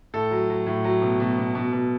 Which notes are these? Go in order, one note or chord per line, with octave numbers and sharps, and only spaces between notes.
A2 A4
F#3
F#3
A2
F#3
B2
B2
B2
B2
B2